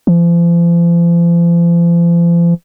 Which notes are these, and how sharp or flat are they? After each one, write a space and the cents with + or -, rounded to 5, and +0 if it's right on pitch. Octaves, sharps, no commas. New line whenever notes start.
F3 -40